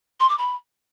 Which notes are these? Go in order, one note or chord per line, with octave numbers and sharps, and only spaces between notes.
C6
D6
B5